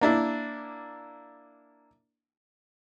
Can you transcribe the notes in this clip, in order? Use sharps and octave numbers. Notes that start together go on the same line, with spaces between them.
A#3 D4 E4